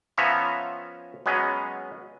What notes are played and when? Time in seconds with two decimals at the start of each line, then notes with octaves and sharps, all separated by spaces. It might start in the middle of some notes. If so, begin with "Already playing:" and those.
0.17 F3 B3 C#4 C#5 E5 A#5
1.26 F#3 G#3 B3 C#4